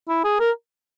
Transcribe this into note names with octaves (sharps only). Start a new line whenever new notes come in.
E4
G#4
A#4